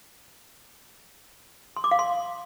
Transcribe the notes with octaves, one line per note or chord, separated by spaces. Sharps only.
C6
D6
F5
C6